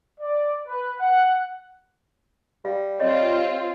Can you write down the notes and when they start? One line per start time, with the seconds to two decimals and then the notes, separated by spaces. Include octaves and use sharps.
0.20 D5
0.67 B4
1.00 F#5
2.65 G3 F5
3.00 C4 F4 C#5 D#5